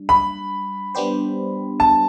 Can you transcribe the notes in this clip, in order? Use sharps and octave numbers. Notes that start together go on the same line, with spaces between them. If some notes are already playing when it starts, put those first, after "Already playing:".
Already playing: G3 D4
B5
G3 B3 D4 G4 C5
A5